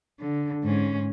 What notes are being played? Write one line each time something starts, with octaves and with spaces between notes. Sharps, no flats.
D3
G#2 C#4